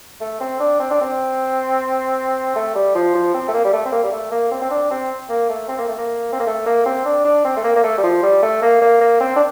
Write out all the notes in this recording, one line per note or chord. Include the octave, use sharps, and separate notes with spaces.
A3
C4
D4
C4
D4
C4
A3
G3
F3
F3
C4
A3
A#3
G3
A3
C4
A#3
G3
A3
A#3
C4
C4
D4
C4
A#3
A3
C4
A#3
A3
A#3
C4
A#3
A3
A#3
C4
D4
D4
C4
A3
A#3
A#3
A3
G3
F3
G3
A3
A#3
A#3
A#3
C4
D4